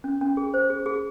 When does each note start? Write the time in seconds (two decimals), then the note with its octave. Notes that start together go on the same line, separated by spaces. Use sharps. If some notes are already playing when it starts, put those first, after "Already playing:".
0.04 C#4
0.21 C#4
0.37 G#4
0.54 C5
0.70 G#4
0.86 G#4